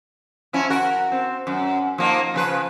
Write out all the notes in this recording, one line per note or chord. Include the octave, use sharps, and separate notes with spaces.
F3 C#4 E4
F#4 A#4
C4
F#2
F3 A#3 D#4
C#3 F3 B4